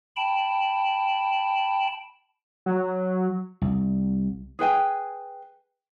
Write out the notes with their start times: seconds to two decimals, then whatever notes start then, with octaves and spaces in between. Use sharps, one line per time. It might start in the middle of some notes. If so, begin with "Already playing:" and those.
0.16 G5 A5 B5
2.66 F#3
3.62 C2
4.59 G#4 B4 G5 G#5